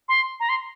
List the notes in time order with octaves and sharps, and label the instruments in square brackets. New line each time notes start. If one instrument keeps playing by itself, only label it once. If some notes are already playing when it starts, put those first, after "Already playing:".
[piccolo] C6
A#5
C6